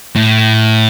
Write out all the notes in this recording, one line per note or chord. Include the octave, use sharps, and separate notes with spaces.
A2